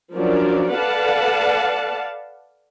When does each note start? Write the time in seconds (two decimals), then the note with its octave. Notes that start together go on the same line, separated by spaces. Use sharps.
0.15 F3 F#3 C#4 D4 A#4 D5
0.76 A4 B4 D5 F5 F#5 A5